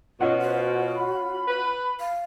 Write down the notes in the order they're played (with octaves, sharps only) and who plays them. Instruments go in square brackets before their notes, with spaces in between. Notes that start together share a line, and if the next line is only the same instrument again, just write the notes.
[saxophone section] B2 [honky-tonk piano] C#4 F4 F#5 [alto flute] D#5
[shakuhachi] F#4 [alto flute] C5
[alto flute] B5
[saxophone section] B4
[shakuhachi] F5